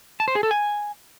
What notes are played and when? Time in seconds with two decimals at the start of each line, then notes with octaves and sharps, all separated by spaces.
0.20 A5
0.28 C5
0.35 G#4
0.43 A4
0.51 G#5